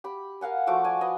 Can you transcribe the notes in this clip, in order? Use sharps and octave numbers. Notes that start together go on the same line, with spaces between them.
G4 B5
A#4 F5 F#5 G#5
F3 A3 F#4 D6
D5 G#5 A5
B4 D#5 G#5